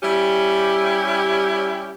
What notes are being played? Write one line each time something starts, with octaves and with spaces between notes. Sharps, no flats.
G3 C#4 E4 G4